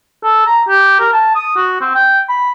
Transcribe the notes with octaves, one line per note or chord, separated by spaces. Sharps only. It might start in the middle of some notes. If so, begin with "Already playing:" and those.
A4
A#5
G4
A#4
A5
D#6
F#4
C4
G5
B5